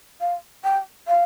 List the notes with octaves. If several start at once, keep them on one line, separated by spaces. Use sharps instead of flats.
F5
G5
F5